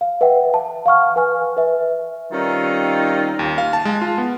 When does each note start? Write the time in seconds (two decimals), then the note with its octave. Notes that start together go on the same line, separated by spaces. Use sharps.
0.01 F5
0.21 B4 E5 F#5 G5
0.54 A5
0.86 F5 F#5 C#6 F6
1.16 B4 G#5 F6
1.57 B4 E5
2.32 D#3 G3 C4 C#4 D#4 F4
3.39 D#2
3.58 F5
3.73 A5
3.85 G#3
4.01 F4
4.18 B3